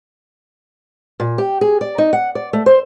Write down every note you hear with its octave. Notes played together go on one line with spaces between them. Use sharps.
A#2
G4
G#4
D5
D#4
F#5
D5
A3
C5